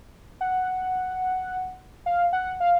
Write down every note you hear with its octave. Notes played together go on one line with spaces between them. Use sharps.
F#5
F5
F#5
F5